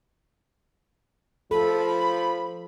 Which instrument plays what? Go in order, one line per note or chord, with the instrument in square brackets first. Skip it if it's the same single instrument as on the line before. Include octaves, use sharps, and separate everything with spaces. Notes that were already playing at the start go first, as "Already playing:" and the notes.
[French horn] F3 [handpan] A4 [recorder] B5